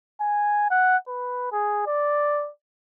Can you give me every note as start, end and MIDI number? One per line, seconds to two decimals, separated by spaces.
0.20 0.66 80
0.71 0.96 78
1.08 1.51 71
1.52 1.85 68
1.87 2.49 74